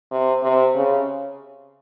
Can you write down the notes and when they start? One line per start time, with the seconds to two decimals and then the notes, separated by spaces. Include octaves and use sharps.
0.11 C3
0.43 C3
0.75 C#3